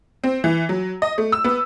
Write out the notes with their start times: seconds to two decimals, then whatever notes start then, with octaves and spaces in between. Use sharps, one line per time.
0.24 C4
0.44 E3
0.69 F#3
1.02 D#5
1.18 A3
1.32 E6
1.44 B3